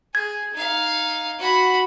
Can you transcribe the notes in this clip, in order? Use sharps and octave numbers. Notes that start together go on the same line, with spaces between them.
G#4 G#6
D#4 F5
F#4 B5